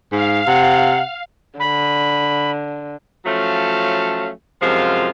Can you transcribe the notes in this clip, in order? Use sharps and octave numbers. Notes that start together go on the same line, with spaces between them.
G#2 F5
C3 F#5
D3 B5
F3 F#3 A3 C#4 F5 A5
F#2 C3 F3 G#3 F4 F5